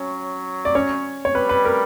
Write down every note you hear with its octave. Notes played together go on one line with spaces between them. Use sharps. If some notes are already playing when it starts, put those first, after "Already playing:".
Already playing: F#3 C#4
D5
C#4 C#5
C#5
G3 B4
B4
A#4